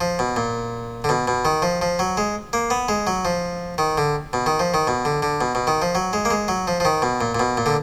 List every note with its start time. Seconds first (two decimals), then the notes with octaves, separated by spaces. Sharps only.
0.01 F3
0.19 B2
0.36 A#2
1.04 D3
1.09 B2
1.28 B2
1.45 D#3
1.62 F3
1.82 F3
1.99 F#3
2.17 G#3
2.53 A#3
2.70 B3
2.89 G#3
3.07 F#3
3.25 F3
3.78 D#3
3.97 D3
4.33 B2
4.46 D#3
4.59 F3
4.74 D#3
4.87 B2
5.05 D3
5.23 D3
5.41 B2
5.55 B2
5.67 D#3
5.82 F3
5.95 F#3
6.13 G#3
6.25 A#3
6.30 G#3
6.48 F#3
6.67 F3
6.80 F3
6.85 D#3
7.02 B2
7.21 A#2
7.35 A#2
7.39 B2
7.57 A#2
7.66 D3